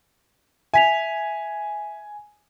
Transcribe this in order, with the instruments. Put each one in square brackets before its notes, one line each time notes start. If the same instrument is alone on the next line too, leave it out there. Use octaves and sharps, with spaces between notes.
[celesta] E5 B6 F7 [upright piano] G#5